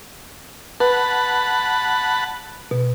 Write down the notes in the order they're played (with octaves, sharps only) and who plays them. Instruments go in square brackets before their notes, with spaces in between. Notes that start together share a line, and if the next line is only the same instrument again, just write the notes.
[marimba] B4 [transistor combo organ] F#5 A5 B5
[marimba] B2